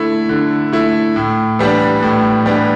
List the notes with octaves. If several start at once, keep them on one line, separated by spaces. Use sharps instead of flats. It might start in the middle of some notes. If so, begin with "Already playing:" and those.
Already playing: D3 A3 E4
D3
A3 E4
A2
E3 G3 B3 D4
A2
E3 G3 B3 D4